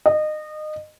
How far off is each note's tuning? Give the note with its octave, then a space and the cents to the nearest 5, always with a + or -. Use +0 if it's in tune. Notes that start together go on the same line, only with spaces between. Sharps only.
D#5 -25